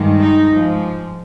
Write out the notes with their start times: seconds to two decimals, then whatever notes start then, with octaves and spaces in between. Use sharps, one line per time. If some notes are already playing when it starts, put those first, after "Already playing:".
Already playing: G2 D#3 G#3
0.20 D#4
0.52 G#2 F3 G#3